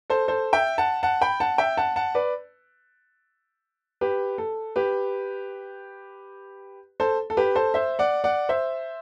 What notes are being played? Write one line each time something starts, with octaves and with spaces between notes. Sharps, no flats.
A4 C5
A4 C5
E5 G5
F#5 A5
F#5 A5
G5 B5
F#5 A5
E5 G5
F#5 A5
F#5 A5
B4 D5
G4 B4
A4
G4 B4
A4 C5
A4
G4 B4
A4 C5
C5 E5
D5 F#5
D5 F#5
C5 E5